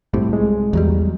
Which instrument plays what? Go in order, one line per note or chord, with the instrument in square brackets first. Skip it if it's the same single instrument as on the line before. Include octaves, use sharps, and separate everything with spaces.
[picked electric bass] C2 A2 C3
[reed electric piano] G#3
[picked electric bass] E2 F#3 G3